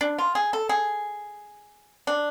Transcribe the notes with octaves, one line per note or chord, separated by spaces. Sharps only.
D4
F4
G#4
A4
G#4
D4